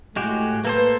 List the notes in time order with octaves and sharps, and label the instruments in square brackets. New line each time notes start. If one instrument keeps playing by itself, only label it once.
[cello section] A2 [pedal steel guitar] G#3 F#4 G4
[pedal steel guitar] A#3 A4 C5 [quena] B4